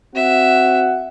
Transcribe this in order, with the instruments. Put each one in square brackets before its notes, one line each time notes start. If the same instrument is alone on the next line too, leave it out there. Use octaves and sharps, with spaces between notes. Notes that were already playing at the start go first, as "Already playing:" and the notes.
[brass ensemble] C4 F#4 F#5 [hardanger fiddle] E5